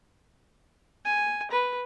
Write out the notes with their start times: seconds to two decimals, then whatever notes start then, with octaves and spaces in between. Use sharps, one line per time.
1.05 G#5
1.51 B4